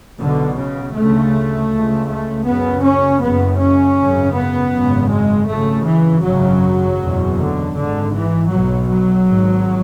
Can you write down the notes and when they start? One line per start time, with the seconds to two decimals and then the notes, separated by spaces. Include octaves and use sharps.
0.20 B1 B2 D3
0.58 C#3
0.96 D2 C#3 A3
1.71 C#2 C#3
2.09 A3
2.47 F#1 F#2 C#3 B3
2.84 C#4
3.22 F#1 F#2 C#3 B3
3.60 C#4
3.97 G#1 F#2 C#3
4.35 B3
4.73 G#1 F#2 C#3
5.10 G#3
5.48 G#1 F#2 C#3 A3
5.86 E3
6.24 G#1 F#2 C#3 F#3
6.99 F#1 E2 B2
7.37 D3
7.74 G#1 G#2 D3
8.12 E3
8.50 B1 B2 F#3
8.88 F#3
9.25 G#1 G#2